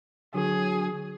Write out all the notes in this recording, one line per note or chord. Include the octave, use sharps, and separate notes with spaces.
D3 F#3 G#4